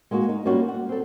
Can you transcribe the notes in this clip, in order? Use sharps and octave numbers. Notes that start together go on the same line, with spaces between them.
G#3 A#3 D#4 F#4
D#4
G3 A#3 C#4 D#4 F4 F#4
F#5
C4 A4